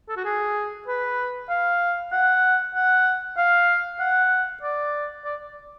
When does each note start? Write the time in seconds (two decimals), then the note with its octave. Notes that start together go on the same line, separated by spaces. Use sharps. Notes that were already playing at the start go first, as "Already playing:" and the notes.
0.09 A4
0.17 F#4
0.25 G#4
0.87 B4
1.49 F5
2.12 F#5
2.75 F#5
3.37 F5
4.00 F#5
4.62 D5
5.25 D5